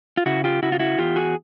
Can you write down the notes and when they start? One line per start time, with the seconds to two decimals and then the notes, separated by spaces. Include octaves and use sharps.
0.17 F4
0.26 C#3 E4 F#4
0.44 F4 G4
0.63 C#3 E4 F#4
0.72 F4
0.79 E4 F#4
0.98 E2 F4 G4
1.16 F#4 G#4